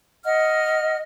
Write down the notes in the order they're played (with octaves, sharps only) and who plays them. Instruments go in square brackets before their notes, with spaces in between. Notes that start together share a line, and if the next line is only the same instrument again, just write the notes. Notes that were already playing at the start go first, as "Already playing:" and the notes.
[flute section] D#5 F#5 F6